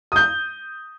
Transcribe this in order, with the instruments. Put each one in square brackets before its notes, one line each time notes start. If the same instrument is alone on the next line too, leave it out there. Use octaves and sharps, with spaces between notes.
[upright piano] D#6 G6